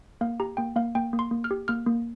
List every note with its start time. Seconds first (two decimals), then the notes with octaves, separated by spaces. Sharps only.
0.21 A#3 F5
0.40 G4 A#5
0.57 A#3 G5
0.76 A#3 F5
0.95 A#3 G5
1.13 A#3
1.19 C6
1.31 A#3
1.44 F6
1.51 G4
1.68 A#3 F6
1.87 A#3